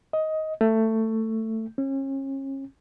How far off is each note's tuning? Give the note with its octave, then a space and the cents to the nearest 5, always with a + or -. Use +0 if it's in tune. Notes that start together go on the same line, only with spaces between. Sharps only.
D#5 +15
A3 +15
C#4 -35